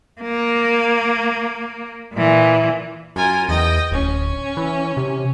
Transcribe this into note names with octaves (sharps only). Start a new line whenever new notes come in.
A#3
A#2 E3
F#2 F4 A#4 G#5
E2 D#5 G5
D1 C#4
E3
C3